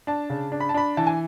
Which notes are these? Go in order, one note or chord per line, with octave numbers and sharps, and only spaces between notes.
D4 A5
C#3
D4
B5
A5
D4 B5
E3 A5
G#5